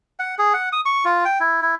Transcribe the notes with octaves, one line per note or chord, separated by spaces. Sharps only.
F#5
G#4
F#5
D#6
C#6
F4
G5
E4
E4